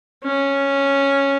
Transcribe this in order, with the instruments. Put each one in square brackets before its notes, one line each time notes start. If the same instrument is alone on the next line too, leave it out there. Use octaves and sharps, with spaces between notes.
[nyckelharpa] C#4